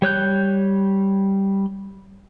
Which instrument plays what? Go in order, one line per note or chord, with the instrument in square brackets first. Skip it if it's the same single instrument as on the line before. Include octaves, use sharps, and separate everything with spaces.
[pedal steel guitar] G3 C#5 F#6 G6